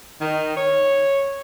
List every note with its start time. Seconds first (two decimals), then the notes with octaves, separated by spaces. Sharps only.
0.22 D#3
0.57 C#5